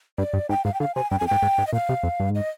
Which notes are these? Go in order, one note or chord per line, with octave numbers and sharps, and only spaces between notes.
G2 D5
G2
G#2 G5
G#2 F5
G5
D3 F5
C3 G#5
G2 G5
F2 G#5
G#2 G5
G#2
G#2
D#5
A#2 F5
C3
F2
G2
G#2 D#5